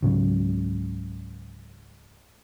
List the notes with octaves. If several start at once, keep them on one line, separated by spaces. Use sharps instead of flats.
C#2 G#2 C#3 F#3